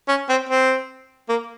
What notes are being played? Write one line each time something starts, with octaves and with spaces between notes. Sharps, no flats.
C#4
C4
C4
A#3